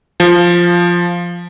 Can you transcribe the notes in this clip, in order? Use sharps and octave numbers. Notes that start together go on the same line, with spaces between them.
F3